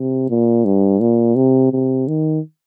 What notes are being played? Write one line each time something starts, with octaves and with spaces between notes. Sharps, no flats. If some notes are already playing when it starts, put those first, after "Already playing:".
Already playing: C3
A#2
G2
A#2
C3
C3
D#3